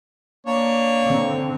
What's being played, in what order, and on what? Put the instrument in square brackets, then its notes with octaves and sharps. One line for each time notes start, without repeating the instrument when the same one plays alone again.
[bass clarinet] A#3 [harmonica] D4 C#5
[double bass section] D3 C4